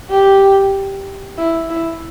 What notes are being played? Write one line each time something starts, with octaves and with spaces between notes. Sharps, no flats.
G4
E4
E4